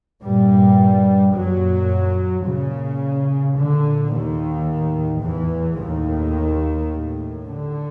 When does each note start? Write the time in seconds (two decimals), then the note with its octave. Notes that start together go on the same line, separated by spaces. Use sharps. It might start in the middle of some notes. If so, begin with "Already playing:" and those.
0.22 G2 A#2 G3
1.34 F#2 A#2 F#3
2.45 A#2 C#3
3.56 A#2 D3
4.12 D#2 D#3
4.67 A2
5.22 E2 E3
5.78 D#2 A2 D#3
6.89 A2
7.44 D3